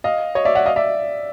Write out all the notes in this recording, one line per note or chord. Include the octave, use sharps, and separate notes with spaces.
D#5 F5
C#5 D#5
D5 E5
E5 F#5
D#5 F5
D5 E5